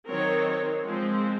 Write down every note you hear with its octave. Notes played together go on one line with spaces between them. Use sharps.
D#3 F#3 C4 A#4 C#5
F3 G#3 C4